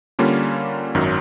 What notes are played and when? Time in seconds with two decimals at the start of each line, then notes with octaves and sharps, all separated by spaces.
0.19 D3 G3 A#3 C#4 F4
0.95 G#1 F#2 D#3 F#3